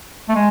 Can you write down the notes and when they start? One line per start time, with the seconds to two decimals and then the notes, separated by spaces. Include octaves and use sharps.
0.29 A3
0.35 G#3